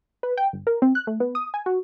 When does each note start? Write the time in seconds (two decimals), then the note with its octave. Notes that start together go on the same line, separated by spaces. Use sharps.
0.23 B4
0.37 G5
0.53 G1
0.67 A#4
0.82 C4
0.95 F#6
1.07 A3
1.20 B3
1.35 D#6
1.54 G#5
1.66 F#4